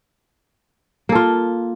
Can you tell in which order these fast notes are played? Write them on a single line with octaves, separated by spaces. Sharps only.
A#3 A4 F4